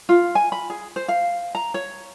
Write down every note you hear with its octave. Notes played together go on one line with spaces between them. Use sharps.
F4
G#5
B5
G#4
C5
F5
A#5
C#5